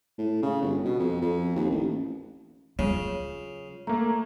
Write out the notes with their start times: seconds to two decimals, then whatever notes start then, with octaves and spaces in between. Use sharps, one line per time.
0.18 A2
0.42 C#3
0.62 G1
0.85 B2
0.99 F2
1.21 F2
1.56 D#2
1.70 A1
2.79 C#3 F#3 F4
3.87 A3 A#3 A#5